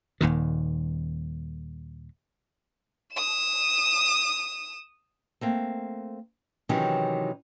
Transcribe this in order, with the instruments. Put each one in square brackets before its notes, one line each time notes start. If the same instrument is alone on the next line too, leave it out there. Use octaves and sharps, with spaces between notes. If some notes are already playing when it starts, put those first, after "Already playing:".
[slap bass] D#1 D#2 A#2 D#3
[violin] D#6 E7
[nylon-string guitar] A3 A#3 C4
C3 D#3 E3 F#3 C#4 G4